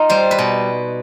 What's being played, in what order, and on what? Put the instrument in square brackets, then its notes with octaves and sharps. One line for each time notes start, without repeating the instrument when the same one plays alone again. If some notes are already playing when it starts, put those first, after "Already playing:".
Already playing: [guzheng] D#4 F4
G3 C5
B4
B2